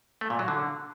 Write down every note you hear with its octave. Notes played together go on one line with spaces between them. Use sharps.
A3
A#2
F#3
D3